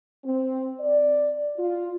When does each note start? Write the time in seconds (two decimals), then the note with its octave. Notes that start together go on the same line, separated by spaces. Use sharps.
0.25 C4
0.80 D5
1.57 F4